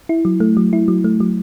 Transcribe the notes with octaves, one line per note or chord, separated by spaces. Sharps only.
E4
F#3
A3
F#3
E4
F#3
A3
F#3